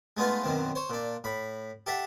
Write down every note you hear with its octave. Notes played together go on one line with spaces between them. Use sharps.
G#3 A3 B3 D#4 F4
F#2 B2 D#3 C4
C5 C#5
A#2 D4
A2 B5
G4 A4 E5 F#5